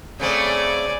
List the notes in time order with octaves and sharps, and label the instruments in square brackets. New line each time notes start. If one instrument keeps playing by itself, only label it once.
[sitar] C#3 A3 C4 [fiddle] D5 G#5